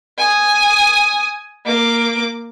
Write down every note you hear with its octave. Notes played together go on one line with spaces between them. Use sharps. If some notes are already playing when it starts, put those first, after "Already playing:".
G#5 D#6
A#3 D6